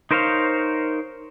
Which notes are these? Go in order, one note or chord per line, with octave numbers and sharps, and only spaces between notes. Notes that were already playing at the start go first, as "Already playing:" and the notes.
D#4 A#4 C5 C#5 F5